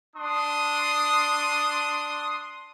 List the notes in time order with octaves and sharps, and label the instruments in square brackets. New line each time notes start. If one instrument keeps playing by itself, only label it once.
[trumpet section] D4 C6 D#6